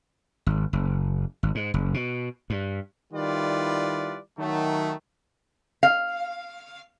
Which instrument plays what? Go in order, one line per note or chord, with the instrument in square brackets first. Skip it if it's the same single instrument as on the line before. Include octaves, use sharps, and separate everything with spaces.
[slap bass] G#1
F#1
G#1
G#2
F#1
B2
G2
[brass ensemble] D#3 G3 E4 F4 B4 D5
D#3 F#3 A3
[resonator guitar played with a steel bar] F5